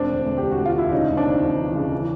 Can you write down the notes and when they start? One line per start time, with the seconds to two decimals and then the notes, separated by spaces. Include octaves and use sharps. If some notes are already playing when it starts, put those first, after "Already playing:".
Already playing: E1 C4 D4
0.10 D2
0.25 D2
0.38 E1 G4
0.52 F#4
0.59 D2
0.66 F4
0.76 E1 E4
0.92 C#3 C#4 D#4
1.08 D#2
1.17 C4 D4
1.26 D#2
1.42 D#2
1.58 E3
1.75 C#3
1.92 E3